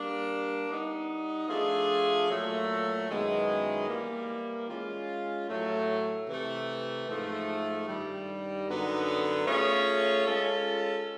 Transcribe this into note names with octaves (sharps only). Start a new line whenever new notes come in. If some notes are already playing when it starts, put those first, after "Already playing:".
Already playing: G3 A#3 D4
G3 B3 D#4
F3 A3 D4 F4 G#4
A#2 F#3 A3
F#2 D#3 G#3 B3 E4
E3 G3 A#3
G#3 C#4 F4
A2 F#3 A3
C3 E3 A3
G#2 F3 A3
G2 D#3 G3
F#2 D3 F#3 B3 D#4
A3 C#4 F4 G#4 C#5
G#3 C#4 F4 A4